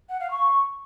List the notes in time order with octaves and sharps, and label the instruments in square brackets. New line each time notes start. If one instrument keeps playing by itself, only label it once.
[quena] F#5
F5
C#6